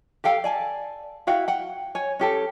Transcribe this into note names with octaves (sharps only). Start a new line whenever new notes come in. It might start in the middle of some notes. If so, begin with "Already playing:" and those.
G4 A4 F5 G5
D5 G#5 A5
E4 F#4 F5 G5
F#5 G5
C#5 G#5
C#4 G4 A4